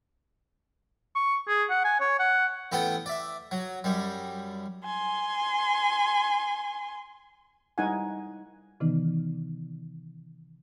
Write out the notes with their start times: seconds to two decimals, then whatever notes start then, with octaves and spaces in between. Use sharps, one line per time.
1.15 C#6
1.48 G#4
1.70 F#5
1.85 G#5
2.00 C#5
2.19 F#5
2.72 A1 B3 A4 G5 D#6
3.06 D5 E5
3.51 F#3
3.84 F#2 G3
4.84 G#5 C6
7.78 G3 D#4 E4 C5 F#5 G#5
8.80 C3 D#3 E3 B3 D#4